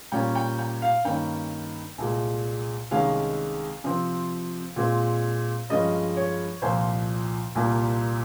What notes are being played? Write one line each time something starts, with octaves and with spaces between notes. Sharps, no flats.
A#2 G3 A#3 C#4 G5
G5
G5
F5
G2 D#3 A#3 C#4 G5
C2 A#2 G#3
C2 C3 D#3 G#3 C#4 F5
C3 F3 C4
A#2 G#3 C4
G2 F3 G#3 C#4 D#5
C#5
C2 A#2 F3 C5
C2 A#2 G3 A#3